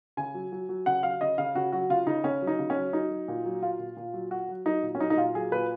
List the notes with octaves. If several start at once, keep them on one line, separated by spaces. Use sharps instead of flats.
C#3 G#5
F#3
F#3
F#3
C#3 F#5
F#3 F5
C#3 D#5
C#3 F5
C#3 F#4
F#3 F#4
C#3 F4
C#3 D#4
C#3 C#4
F#3
D#4
C#3
C#4
F#3
F#3 D#4
F#3
A#2
F#3
A#2 F4
A#2
A#2
F#3
F#3 F#4
F#3
F#3 D#4
A#2
C#4
F#3 D#4
D#4
A#2 F4
F#3 G#4
A#2 B4